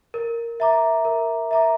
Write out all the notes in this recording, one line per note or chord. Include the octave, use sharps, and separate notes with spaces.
A#4
E5 A#5 D6
A#4
E5 A#5 D6